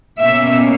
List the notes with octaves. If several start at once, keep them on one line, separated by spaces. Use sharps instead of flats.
B2 A#3 C#4 E5